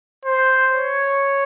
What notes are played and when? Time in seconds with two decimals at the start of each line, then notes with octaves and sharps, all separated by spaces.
0.25 C5
0.71 C#5